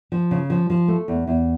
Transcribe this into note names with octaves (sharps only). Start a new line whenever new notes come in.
F3
C#3
F3
F3
A3
E2
E2